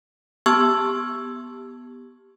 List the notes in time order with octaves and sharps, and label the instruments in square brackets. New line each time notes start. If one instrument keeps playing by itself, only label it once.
[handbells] B3 G4 A5 C#6 E6 G#6